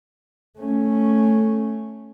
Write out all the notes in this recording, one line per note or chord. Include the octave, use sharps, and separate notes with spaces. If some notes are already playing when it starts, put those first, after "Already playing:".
A3 C#4